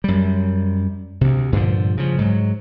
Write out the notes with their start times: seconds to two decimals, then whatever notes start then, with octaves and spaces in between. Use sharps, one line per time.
0.04 F#2 G3
1.21 D2 C3
1.52 G2 A#2 D3 F3
1.97 C#3 F3
2.18 G#2 F#3